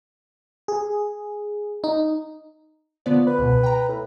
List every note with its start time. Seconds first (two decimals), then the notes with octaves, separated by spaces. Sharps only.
0.68 G#4
1.84 D#4
3.06 D3 F3 B3 D5
3.27 B4
3.39 C#2 B2
3.63 G5 A#5
3.88 A2